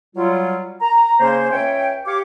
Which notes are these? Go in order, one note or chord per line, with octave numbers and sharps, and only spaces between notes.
F#3 G3 F4
A#5
C#3 A#3 C#4 C5
C#2 C#4 C#5 E5 G5
G4 C#5 F5 D6